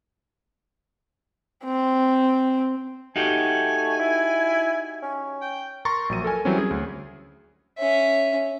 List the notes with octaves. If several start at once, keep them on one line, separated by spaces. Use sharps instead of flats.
C4
A3 D#4 F#4 G4 G#5
E4
C#4
G5
A#4 A#5 C6 C#6 A6
A#1 F#3 D#7
A4 A#4 G#5
E3 F#3 G3 C4 C#4
G#4
D2
C#4 E5